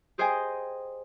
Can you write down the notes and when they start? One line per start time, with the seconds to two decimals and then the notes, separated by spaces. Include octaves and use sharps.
0.18 G4 G#4 C5 D#5 G5 G#5